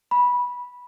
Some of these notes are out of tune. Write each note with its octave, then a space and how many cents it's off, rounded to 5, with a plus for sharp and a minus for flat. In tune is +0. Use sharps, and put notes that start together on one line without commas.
B5 -15